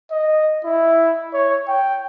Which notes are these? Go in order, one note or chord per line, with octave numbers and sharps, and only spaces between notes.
D#5
E4
C#5
G5